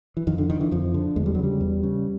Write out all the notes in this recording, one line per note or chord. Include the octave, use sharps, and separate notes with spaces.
E3
F2 D#3
D3
D3 D#3
E3
F2 F3
D3
E2 G#3
G3
F#3
C#3 G3
E2
C#3